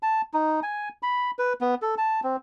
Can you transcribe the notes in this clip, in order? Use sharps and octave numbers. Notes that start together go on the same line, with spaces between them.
A5
D#4
G#5
B5
B4
B3
A4
A5
C4